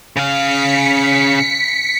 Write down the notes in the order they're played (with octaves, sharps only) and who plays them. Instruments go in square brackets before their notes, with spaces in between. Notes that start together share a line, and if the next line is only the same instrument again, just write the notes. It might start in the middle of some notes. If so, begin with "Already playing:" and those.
[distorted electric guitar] C#3 F5 [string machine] B6 C#7